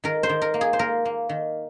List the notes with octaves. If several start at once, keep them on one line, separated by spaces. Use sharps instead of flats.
D#3 A#4
C5
D#3
A#4
A#3
G#4
C5
A#3 A#4
A#3
D#3